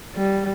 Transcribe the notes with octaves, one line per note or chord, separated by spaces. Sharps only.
G3